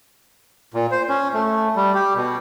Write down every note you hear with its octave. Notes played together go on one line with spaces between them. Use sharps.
A#2
C5
C#4
A3
G3
G4
B2